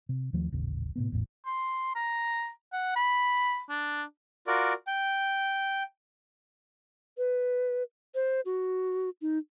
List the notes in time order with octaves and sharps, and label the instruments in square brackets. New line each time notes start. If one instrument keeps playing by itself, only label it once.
[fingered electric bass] C3
D#2 D#3 F3 A3
D#1 A1 C#3
A2 C3 B3
A1 E2 A2
[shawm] C6
A#5
F#5
B5
D4
[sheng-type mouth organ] F4 F#4 A#4 D5
G5
[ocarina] B4
C5
F#4
D#4